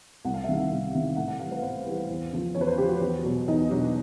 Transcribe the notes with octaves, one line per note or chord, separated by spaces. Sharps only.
C2 F#5
F5
E5
C3 D#3 G3 F5
C2
C3 D#3 G3
A2 F#5
F#5
E3 G3 F5
B4
A2 C5
E3 G3
E2
C#3 F3
E2 C#5
B4
C5
C#3 F3 G4
F#4
E2
B2 F#3
E2 D#4
B2 F#3 D4